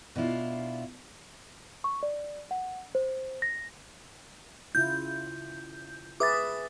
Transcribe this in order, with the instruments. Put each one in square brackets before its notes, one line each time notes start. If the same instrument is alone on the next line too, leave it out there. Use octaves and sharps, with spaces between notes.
[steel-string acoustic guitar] B2 D4 E4 F4
[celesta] C#6
D5
F#5
C5
A#6
[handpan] C#3 E4 F4 [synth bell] G6
[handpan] G#4 B4 E5 [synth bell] D6 D#6 A6